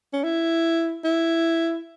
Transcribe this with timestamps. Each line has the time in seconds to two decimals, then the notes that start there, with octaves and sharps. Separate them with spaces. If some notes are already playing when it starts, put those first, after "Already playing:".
0.13 C#4
0.24 E4
1.05 E4